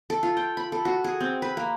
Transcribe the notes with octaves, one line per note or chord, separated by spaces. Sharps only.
A4
F4
G5
B5
A4
F#4
G#4
C4
B4
A#3